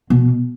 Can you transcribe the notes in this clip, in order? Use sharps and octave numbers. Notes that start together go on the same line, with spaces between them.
B2